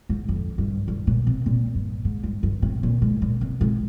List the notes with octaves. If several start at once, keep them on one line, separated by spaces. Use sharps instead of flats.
G#2
F2
G2
G2
A#2
C3
A#2
G2
G#2
G2
G2
C3
A#2
G#2
A#2
C3
G#2